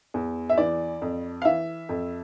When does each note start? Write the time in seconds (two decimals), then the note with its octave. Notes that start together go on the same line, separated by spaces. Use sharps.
0.14 E2
0.49 E5
0.58 E3 D5
1.02 F2
1.42 F5
1.45 E3 E5
1.89 F2